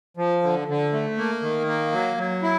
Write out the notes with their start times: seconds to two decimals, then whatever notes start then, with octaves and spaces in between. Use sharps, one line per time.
0.17 F3
0.42 D3
0.68 D3
0.93 A3
1.18 A#3
1.42 D#3
1.67 A#3
1.92 F#3
2.18 F#3
2.43 E4